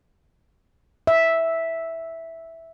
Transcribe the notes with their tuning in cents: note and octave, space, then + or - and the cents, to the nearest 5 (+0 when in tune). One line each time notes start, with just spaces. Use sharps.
E5 -5